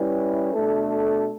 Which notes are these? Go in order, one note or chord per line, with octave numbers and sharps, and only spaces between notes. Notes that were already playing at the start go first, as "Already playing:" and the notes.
Already playing: G3 C#4 E4 B4
B2 A3 D4 A4